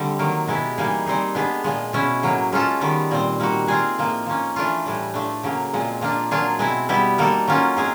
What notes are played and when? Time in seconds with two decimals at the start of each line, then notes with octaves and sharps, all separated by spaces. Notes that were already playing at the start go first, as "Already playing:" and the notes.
Already playing: D3 G3 A3 C4 A4
0.19 D#3 F#3 A#3
0.48 B2 G#3 B3 E4 G4
0.78 E3 G3 A#3 D#4 G#4
1.06 G3 C4 D#4 G#4
1.35 G#3 B3 D4 G4
1.64 A#2 F3 G#3
1.93 B2 G#3 C#4 E4
2.23 A2 F#3 A#3
2.52 G#3 C#4 F4 A4
2.81 D#3 G3 B3
3.11 A#2 G3 C4
3.40 G3 A#3 D#4 F#4
3.67 G#3 C4 F4 G#4
3.98 A2 F3 A#3
4.27 F3 A#3 C#4
4.56 E3 A3 D4 F4
4.86 A2 E3 G3
5.14 F3 A3 D4
5.43 C#3 F#3 A#3
5.73 A#2 F3 G#3 C4
6.01 F3 A#3 D4 F4
6.31 F#3 A#3 D4 F4 G#4
6.59 B2 G#3 C4 E4
6.89 G3 B3 E4 G4
7.18 G3 A#3 D#4 F#4 A4
7.48 F#3 A#3 C#4 F4
7.77 G#3 C4 F4 G#4